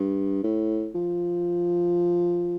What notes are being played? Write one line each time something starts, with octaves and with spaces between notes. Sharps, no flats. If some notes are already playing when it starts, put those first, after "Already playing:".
Already playing: G2
A2
F3